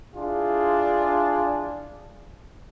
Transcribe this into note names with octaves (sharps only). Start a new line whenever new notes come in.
D4 E4 F4 G#4